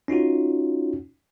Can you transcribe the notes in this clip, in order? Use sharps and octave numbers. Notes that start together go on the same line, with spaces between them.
C#4 D#4 F4 F#4